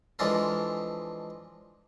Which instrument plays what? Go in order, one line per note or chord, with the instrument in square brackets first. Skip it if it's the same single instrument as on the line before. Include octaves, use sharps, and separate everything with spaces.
[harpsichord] E3 F3 G#3 D4 A4 A#4